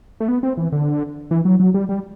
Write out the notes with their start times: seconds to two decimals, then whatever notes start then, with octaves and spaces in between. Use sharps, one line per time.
0.20 A3
0.28 B3
0.43 C4
0.57 E3
0.72 D3
1.31 E3
1.45 F#3
1.60 F#3
1.74 G3
1.89 G3